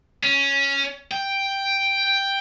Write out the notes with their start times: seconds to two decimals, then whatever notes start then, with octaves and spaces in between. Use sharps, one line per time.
0.23 C#4
1.11 G5